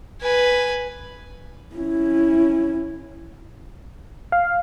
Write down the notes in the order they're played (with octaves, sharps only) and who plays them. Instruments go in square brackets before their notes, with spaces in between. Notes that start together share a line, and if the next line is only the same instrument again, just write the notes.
[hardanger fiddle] B4 G#5
[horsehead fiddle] C#4 E4
[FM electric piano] F5